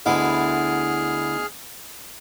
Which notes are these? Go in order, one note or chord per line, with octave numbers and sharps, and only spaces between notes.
D2 B2 D3 B3 E4 G#4 F6